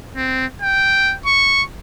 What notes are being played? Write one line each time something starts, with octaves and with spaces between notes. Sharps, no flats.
C4
G5
C#6